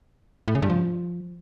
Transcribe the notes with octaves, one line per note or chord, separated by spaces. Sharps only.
A2
C#3
G2
F3